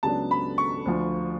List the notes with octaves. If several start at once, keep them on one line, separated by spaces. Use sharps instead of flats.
C#2 C#3 F#3 B3 D4 A5
B5
C#6
D2 D3 F3